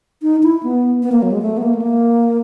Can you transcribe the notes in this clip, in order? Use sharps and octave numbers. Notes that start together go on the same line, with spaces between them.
D#4
E4
B3
B3
A#3
F#3
G#3
A3
B3
A#3
A3
A#3